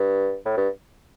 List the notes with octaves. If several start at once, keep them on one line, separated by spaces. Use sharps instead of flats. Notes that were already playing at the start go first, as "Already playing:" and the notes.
Already playing: G2
A2
G2